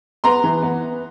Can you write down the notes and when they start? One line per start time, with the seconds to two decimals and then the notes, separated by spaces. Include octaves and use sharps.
0.24 B3 A#5 C6
0.44 E3
0.62 B3